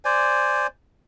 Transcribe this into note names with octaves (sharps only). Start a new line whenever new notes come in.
C5 D5 G#5